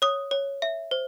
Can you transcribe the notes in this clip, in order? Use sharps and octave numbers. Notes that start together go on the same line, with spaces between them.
C#5 D#6
C#5
E5
C5